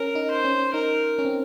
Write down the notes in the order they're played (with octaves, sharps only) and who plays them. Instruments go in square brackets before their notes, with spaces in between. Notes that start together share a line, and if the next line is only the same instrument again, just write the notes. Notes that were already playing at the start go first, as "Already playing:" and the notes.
Already playing: [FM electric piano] C#4 [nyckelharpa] A#4
[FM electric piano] D#4
[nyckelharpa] C5
[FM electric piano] C#4
[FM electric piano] D#4 [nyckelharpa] A#4
[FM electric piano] C#4
C4